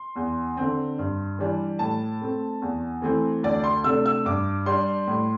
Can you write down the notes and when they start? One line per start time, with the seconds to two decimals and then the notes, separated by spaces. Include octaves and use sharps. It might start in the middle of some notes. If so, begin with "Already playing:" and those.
Already playing: C6
0.16 E2
0.57 D3 C4
0.98 G2
1.38 E3 G3 D4
1.79 A2 A5
2.21 A3 C4
2.62 E2
3.02 E3 A3 C4
3.43 D2 D5
3.64 C6
3.84 C3 A3 D4 E6
4.06 E6
4.25 G2 D6
4.66 G3 D4 C6
5.07 A2